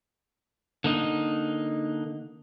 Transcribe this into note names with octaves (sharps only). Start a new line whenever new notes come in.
D3 A#3 D#4